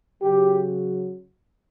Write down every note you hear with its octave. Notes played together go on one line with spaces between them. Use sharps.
C#3 F#3 G4